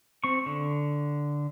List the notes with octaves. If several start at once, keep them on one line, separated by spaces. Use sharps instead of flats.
C4 C#6
D3